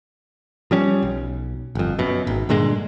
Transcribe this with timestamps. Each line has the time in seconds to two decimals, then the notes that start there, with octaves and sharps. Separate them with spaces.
0.71 F3 G3 C#4
1.03 B1
1.75 G1 F2
1.99 F#2 B2
2.27 G#1
2.49 G2 A#2 D3 G#3